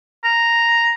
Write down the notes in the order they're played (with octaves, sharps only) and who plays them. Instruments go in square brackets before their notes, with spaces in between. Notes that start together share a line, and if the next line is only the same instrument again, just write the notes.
[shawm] A#5